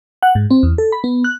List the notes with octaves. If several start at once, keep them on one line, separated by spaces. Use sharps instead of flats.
F#5
G#2
C4
E2
A4
B5
B3
F#6